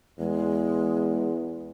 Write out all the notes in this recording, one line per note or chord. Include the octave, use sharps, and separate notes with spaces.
E2 G#3